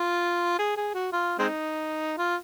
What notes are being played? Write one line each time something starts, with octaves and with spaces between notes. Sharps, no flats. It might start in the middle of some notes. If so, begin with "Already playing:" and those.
Already playing: F4
G#4
G#4
F#4
F4
G#3 C4 D#4
F4